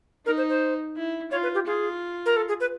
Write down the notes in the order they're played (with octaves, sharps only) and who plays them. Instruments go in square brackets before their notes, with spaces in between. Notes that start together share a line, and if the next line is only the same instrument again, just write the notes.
[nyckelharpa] D#4 [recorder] A#4
[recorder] C5
C5
[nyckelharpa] E4
[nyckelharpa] F4 [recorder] C#5
[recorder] B4
G4
[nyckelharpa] F4 [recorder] G#4
[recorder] A#4
A4
G#4
B4